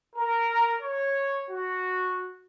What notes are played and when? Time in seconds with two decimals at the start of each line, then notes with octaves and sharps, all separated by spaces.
0.16 A#4
0.80 C#5
1.49 F#4